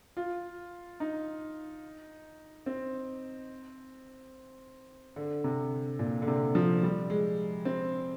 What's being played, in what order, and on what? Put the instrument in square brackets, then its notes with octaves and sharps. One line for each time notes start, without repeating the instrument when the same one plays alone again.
[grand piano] F4
D#4
C4
D3
C3
A#2
D3
C3
F3
G3
G#3
C4